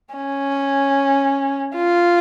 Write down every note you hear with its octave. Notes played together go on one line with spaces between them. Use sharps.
C#4
F4